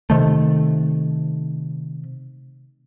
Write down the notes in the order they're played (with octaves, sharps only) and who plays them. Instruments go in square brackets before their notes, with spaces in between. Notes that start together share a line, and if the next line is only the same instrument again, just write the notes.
[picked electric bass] C3 D#3 A3